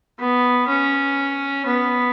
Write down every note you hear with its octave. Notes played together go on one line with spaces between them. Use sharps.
B3
C#4
B3